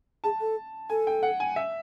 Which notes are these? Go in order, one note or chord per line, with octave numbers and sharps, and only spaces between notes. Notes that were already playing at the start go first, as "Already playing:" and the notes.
G#4 A5
A4
A4 G#5
G5
F#5
G#5
E5